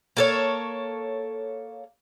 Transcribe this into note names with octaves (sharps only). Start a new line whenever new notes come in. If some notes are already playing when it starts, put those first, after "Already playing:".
A#3 A4 C#5